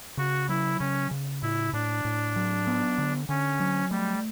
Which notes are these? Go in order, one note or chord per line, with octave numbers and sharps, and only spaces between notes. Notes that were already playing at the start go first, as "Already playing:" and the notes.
C#3 F#4
F#3 E4
C#3 C#4
C#3
A2 E4
A2 D4
A2
F#3
B3
D3
D3 C#4
F#3
G3 A3